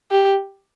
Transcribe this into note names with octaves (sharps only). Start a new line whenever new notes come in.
G4